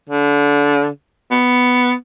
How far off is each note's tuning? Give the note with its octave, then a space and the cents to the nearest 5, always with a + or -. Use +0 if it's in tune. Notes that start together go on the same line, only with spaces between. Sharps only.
D3 -25
B3 +5